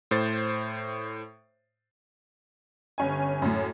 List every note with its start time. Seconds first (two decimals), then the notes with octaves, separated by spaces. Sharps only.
0.11 A2 C5 A6
2.98 G1 C#4 G#5
3.42 F#2 A2